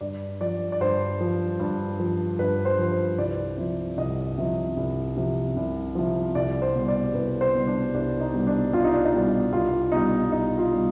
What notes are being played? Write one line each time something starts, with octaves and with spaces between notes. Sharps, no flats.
G2 D5
F3 D5
D5
G2 C5
F3
G2
F3
G2 B4
C5
F3
C5
C2 D5
C3 F3
C2 D#5
C3 F3
C2
C3 F3
C2
C3 F3
C2 D5
C5
B2 G3
D5
C2 B4
C5
B2 G3
D4
C2 D4
D#4
B2 G3
D4
C2 F4
D#4
D4
D#4
B2 G3
C2 F4
B2 G3 D#4
C2 D#4
F4
B2 G3